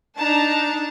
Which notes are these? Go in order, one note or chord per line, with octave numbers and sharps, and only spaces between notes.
D4 D#4 A5 A#5